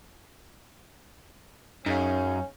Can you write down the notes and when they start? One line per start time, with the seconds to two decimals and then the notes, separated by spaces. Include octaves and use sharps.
1.86 F#2 C#4 D#4 G#4 F5